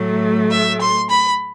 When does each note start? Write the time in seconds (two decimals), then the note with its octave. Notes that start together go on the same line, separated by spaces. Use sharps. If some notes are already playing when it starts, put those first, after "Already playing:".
Already playing: A2 F#3 A3
0.51 E5
0.80 C6
1.10 B5